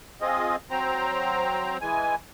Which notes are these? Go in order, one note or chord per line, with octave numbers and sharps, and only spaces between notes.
C4 F4 G#4 D#5
F#3 C4 C5 G5 A#5
E3 G#3 G#5